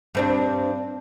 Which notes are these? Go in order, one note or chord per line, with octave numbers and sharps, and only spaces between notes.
G2 C4 D4